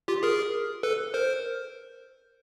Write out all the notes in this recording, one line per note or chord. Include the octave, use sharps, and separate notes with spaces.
F4 G4
G#4 A#4
A4 B4
A#4 C5